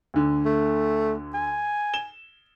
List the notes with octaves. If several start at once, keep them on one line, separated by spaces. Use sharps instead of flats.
D2 D3
A3
G#5
E7 G7